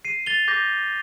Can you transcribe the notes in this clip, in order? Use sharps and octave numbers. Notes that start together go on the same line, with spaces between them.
C7 D#7
A6 F7 G7
D6 G6 A#6